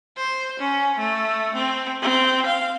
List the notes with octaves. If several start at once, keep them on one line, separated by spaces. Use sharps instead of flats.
C5
C#4
A3
C4
C4
F5